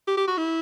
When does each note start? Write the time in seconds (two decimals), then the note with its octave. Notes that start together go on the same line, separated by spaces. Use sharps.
0.07 G4
0.17 G4
0.28 F#4
0.37 E4